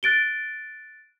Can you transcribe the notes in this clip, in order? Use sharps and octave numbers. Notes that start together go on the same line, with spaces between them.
F#6 A6 D7 G7